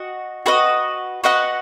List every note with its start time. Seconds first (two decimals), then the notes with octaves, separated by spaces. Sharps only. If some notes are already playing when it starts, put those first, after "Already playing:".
Already playing: F#4 D#5 F#5
0.46 F#4 B4 D#5 F#5
1.24 F#4 B4 D#5 F#5